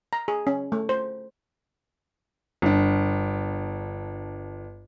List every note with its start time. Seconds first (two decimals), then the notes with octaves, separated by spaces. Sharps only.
0.13 A#5
0.28 G#4
0.47 C#4
0.72 A3
0.89 C5
2.62 G1 D4